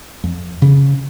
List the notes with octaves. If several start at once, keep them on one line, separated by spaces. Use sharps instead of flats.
F2
C#3